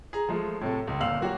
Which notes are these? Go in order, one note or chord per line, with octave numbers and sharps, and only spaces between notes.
G#4 A#5
F3 G#3 A3
A2 C3 A3
C#2
G1 A#2 F5 E6 F#7
F#3 A#3 F#4 G4 C#5